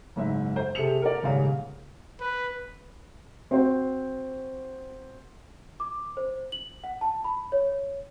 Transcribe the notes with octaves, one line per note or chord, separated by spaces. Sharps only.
F#1 G#2 E5
C5
C3 G#4 A4 C#7 F7
A#4 D5
D#1 G#2 C#3 F5
B4
C4 F#4 C5
D6
C5
F#7
F#5
A5
B5
C#5